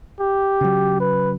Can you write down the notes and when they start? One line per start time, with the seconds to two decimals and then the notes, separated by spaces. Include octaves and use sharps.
0.20 G4
0.61 C#3 F#3
1.00 B4